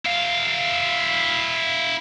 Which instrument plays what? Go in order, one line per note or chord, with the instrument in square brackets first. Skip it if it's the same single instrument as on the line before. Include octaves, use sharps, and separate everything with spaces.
[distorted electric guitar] E4 F5